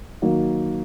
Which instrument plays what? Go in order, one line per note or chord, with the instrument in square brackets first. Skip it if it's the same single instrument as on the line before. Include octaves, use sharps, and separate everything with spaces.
[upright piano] D#3 F#3 A#3